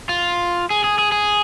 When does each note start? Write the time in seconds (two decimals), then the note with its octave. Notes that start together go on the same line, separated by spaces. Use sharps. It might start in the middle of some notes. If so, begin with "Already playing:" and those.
0.09 F4
0.70 G#4
0.84 G#4
0.99 G#4
1.12 G#4